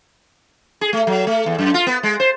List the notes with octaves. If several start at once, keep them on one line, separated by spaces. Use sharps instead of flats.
G#4
A3
F#3
A3
E2
F#2
F4
B3
G#3
C5